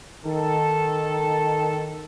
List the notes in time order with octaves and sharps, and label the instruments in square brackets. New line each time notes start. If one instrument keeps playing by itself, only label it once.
[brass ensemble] D#3 A4